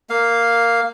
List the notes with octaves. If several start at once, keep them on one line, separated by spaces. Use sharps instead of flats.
A#3 F5